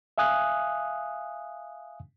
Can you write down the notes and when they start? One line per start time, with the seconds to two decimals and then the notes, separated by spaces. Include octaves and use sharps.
0.18 E5 F5 G#5 D#6 F#6